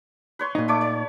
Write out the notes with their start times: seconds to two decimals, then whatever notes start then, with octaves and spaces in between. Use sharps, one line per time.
0.39 B4 C#5 C6
0.55 A#2 D#4
0.68 A3 C#5 D6
0.81 C#5